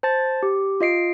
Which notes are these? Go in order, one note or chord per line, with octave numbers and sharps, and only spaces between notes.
C5 A5 A6
G4
F4 D#5 C7 D7